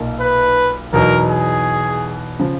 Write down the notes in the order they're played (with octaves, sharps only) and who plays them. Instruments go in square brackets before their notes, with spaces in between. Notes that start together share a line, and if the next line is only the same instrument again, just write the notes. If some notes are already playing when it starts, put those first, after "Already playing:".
Already playing: [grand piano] B1 A#2 A#3 D#4
[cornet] B4
[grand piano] E2 B2 F#3 B3 D#4 [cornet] A#4
[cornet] G#4
[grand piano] C#3 F3